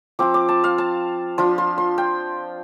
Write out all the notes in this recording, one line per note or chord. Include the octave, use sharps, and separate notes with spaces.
F3 C4 F4 D6
D6
A5
F5
A5
F3 D4 F4 C6
C6
C6
G5